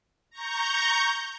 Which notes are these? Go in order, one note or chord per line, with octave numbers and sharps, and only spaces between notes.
A#5 C#6 G6